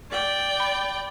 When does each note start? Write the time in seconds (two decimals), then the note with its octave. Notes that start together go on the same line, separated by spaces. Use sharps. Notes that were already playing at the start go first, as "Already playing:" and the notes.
0.11 D5 G5
0.60 B5